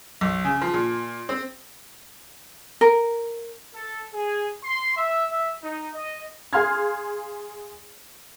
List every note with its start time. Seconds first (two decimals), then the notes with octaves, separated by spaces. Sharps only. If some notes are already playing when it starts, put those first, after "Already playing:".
0.21 B1
0.44 C#3
0.61 F3
0.74 A#2
1.29 C4
2.81 A#4
3.74 A4
4.14 G#4
4.63 C6
4.97 E5
5.29 E5
5.62 D#4
5.93 D#5
6.53 G#4 F5 C6 F6 G#6